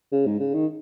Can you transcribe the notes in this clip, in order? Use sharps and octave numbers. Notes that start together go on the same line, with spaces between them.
C#3
G#2
C#3
D#3